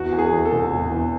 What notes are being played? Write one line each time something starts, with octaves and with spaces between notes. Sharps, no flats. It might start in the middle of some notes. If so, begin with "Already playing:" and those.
Already playing: E2 F#4
E2
G#4
E2
A4
E1
E1
E2